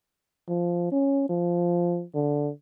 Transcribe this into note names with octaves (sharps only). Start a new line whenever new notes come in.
F3
C#4
F3
D3